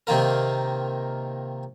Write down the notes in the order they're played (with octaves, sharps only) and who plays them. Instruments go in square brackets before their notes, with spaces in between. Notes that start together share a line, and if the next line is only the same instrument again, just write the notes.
[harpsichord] C3 D#3 A#3 F4 A#4